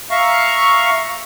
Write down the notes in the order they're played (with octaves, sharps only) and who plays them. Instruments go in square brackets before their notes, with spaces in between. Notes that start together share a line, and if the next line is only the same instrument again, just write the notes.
[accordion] E5 F5 A#5 C#6